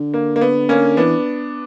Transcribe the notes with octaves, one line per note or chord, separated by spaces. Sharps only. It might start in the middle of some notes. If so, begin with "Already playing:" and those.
Already playing: D3
A#3
A#3
B3
A#3 C#4
E3 B3 D4